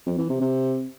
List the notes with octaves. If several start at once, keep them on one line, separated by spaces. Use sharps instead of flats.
F2
E3
C3
C3